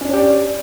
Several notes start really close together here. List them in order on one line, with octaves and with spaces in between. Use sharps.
C#4 D4 C#5 G4 D5